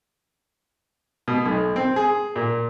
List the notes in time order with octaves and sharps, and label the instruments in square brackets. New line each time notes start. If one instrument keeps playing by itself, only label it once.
[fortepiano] B2
B1
C4
G#4
A#2